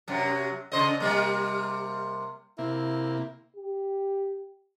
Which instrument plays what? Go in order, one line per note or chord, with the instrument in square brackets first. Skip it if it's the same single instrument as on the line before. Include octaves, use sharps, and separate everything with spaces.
[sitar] F#2 C3 F#3
C#3 C5 D#5
C3 G3 A#3
[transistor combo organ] C3 A#3 [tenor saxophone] E4
[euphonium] G4